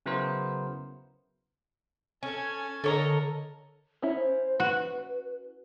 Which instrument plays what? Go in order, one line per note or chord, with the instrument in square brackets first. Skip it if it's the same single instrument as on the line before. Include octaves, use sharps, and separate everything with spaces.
[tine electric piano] C#3 F#3 B3 E4 A#4 C5
[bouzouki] C#4 [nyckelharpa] A4 G#5
[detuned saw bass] D3 [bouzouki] A4 C#5 A#5 [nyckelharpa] A#4 D#5
[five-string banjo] C#4 E4
[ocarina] C5
[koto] F#4 [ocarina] B4